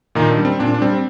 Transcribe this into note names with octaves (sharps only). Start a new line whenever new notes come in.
A#2 D#3 D#4
D4
G3
C4
A#2 D4
D4
G3 C4